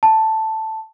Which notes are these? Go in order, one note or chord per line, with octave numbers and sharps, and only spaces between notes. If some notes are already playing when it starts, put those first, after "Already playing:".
A5